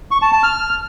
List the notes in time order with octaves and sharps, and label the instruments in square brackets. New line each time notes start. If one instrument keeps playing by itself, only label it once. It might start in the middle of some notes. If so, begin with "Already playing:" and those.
[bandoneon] C#6
A5
A5
F6